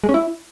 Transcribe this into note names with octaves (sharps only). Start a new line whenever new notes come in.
G#3
C#4
E4